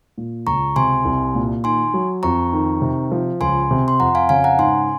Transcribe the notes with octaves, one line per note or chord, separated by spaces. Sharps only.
A#2
C#2 A#5 C#6
C3 G#5 C6
C2
A#2
D#3 G#5 C6
F#3
F2 A#5 C#6
D#3
C3
F3
C#2 G#5 C6
C3
C6
F2 F#5 A#5
F5 G#5
C#3 F5 G#5
F#5 A#5
G#2 G#5 C6